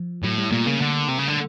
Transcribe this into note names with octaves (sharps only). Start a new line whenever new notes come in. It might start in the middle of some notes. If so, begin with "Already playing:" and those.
Already playing: F3
A2 F#3
G3
A#2 A3
C#3 A#3
D3
C3
C#3
D3